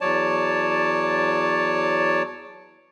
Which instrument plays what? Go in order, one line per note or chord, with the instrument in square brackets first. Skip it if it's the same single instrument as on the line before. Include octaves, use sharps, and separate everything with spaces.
[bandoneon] E2 F#3 C#5 D5 A5